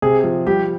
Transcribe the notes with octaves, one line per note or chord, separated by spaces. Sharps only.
C3 G#4
F3
G3 G4